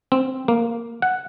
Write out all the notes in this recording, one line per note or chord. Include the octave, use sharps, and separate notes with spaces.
C4
A#3
F#5